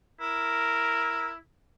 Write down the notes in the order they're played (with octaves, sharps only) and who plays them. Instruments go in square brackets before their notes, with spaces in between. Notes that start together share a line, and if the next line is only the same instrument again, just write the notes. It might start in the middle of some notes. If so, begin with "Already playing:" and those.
[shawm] E4 [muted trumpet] A#4